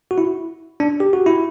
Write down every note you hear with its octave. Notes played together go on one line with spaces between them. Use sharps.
F#4
E4
D4
G4
F#4
E4